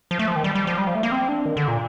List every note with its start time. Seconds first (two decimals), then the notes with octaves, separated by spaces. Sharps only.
0.11 F3
0.19 A3
0.28 F3
0.36 D#3
0.44 G3
0.55 G3
0.67 F3
0.78 G3
0.87 F3
0.95 A3
1.03 A#3
1.12 C4
1.29 D4
1.46 D#3
1.57 D3
1.68 A#2